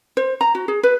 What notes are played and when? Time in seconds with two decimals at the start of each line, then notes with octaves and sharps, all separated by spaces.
0.17 C5
0.41 A#5
0.55 F#4
0.68 G#4
0.83 B4